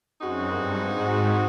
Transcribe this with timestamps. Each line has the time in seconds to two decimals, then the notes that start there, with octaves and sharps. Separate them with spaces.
0.21 F#2 G#3 C4 D#4 F#4
0.50 G2
0.79 G#2